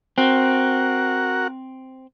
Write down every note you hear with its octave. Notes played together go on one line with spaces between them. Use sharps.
C4 F#4 A#4 F#5